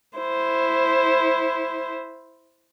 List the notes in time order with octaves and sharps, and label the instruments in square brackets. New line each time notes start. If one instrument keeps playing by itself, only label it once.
[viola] E4 C5